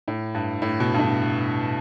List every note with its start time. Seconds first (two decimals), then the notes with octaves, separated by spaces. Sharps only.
0.08 A2
0.35 G2
0.62 A2
0.80 B2
0.94 G2
0.99 A2